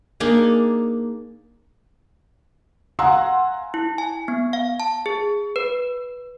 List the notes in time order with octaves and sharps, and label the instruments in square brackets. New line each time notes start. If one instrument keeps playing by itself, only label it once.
[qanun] A#3 D4 D#4 G#4
[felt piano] F5 F#5 G#5 A#5 C6 E6
[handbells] E4
G#5
B3
F5
A5
G#4
B4